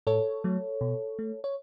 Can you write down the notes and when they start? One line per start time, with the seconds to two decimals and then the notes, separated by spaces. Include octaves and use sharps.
0.07 A2 A4 C#5
0.44 F#3 A3
0.81 B2
1.19 A3
1.44 C#5